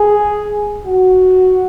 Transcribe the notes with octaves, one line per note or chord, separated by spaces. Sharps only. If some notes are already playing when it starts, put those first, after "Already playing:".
Already playing: G#4
F#4